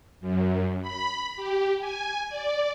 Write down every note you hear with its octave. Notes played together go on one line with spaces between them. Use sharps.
F#2
B5
G4
G#5
D5